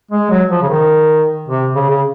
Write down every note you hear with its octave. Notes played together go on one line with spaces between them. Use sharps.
G#3
F#3
F3
C#3
D#3
C3
C#3
C#3